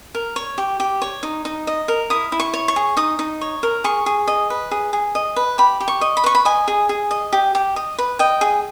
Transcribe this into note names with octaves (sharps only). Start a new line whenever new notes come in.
A#4
C#5
G4
G4
C#5
D#4
D#4
D#5
A#4
E4 D#6
E4
C#6
C#5
C#6
G#4
D#4 D#6
D#4
C#5
A#4
G#4 C#6
G#4
D#5
B4
G#4
G#4
D#5
B4
G4 B5
G4
C#6
D#5
B5
B4 C#6
B5
D#5 G#5
G#4
G#4
D#5
G4
G4
D#5
B4
D#5 G5
G#4